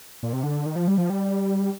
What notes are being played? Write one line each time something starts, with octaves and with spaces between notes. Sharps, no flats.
A#2
C3
D3
D#3
F3
G3
F3
G3